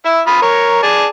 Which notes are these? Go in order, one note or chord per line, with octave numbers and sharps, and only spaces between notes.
E4 E5
F4 B5 D#6
A#4 C#5
G#4 D5 A5